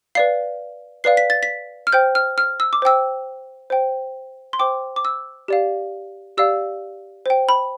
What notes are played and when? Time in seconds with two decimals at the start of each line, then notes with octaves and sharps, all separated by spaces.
0.15 B4 D5 F5 C7
1.04 B4 D5 F5 C7
1.17 B6
1.30 A6
1.43 B6
1.87 F6
1.92 C5 G5 G6
2.15 F6
2.38 F6
2.60 E6
2.73 D6
2.82 C5 G5 E6
3.70 C5 G5
4.53 C6
4.59 C5 G5 D6
4.96 D6
5.05 E6
5.48 G4 D5 F5
6.37 G4 D5 F5 E6
7.26 C5 G5
7.49 B5